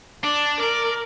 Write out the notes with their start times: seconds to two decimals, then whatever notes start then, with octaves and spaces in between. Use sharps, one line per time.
0.24 D4 D5
0.60 A#4 D5